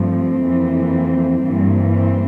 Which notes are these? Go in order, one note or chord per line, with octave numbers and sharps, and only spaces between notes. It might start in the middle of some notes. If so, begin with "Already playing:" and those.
Already playing: G2 F3 A3 C4
F2 E3 A#3
G2 E3 A#3
C4